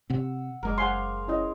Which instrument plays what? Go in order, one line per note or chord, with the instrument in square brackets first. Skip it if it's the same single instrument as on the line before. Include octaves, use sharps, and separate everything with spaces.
[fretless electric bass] C3 C4 [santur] F#5 E6
[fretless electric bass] F#1 G#3 [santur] A#4 G#5 D6
[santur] G#4 C5 F5 [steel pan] F#5 G#5 C6
[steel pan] C#4 E4 D#5